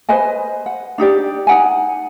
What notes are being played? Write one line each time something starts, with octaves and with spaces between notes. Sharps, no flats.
B4 C5 D#5 G#5
F#5
D4 D#4 G4 D5
D#4 F#5 G#5